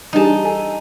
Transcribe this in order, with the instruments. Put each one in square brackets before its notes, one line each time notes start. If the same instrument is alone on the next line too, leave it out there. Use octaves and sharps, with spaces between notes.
[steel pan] E3 G3 G#4 [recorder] D4 [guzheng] D#4 A5
[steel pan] A4 [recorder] G#5